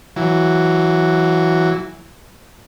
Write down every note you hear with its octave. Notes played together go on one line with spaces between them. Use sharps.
E3 F#3